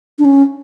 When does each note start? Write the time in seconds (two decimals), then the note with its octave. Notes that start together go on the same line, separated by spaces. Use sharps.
0.19 D4
0.25 C#4